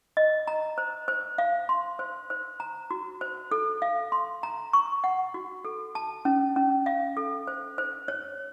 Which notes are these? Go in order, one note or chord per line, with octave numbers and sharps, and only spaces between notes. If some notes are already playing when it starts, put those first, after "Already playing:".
D#5
A#5
C5
C5
F5
C6
C5
C5
A#5
F#4
C5
A4
F5
C6
A#5
C#6
F#5
F#4
A4
A5
C#4
C#4
F5
A4
C5
C5
C#5